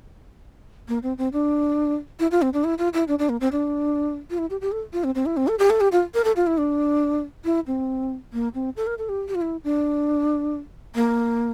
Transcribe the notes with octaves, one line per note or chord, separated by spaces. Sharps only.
A#3
C4
C4
D4
E4
F4
C4
D4
E4
F4
E4
D4
D4
A#3
C4
D4
F4
E4
G4
G4
A4
F4
C4
C4
E4
C4
A4
G4
A4
G4
F4
A#4
A4
F4
E4
D4
E4
C4
A#3
C4
A4
A#4
A4
G4
G4
F4
E4
D4
A#3